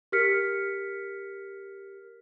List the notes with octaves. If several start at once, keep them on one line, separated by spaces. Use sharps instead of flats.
G4 A#4 F6 B6 C#7